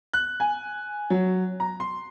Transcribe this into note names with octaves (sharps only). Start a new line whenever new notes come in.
F#6
G#5
F#3
A#5
C6